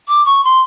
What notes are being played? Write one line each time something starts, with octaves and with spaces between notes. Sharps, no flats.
D6
C#6
C6